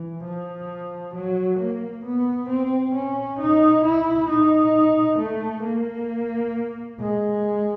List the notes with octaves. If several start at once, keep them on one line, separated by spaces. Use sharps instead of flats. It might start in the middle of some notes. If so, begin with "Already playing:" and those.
Already playing: E3
F3
F#3
A#3
B3
C4
C#4
D#4
E4
D#4
A3
A#3
G#3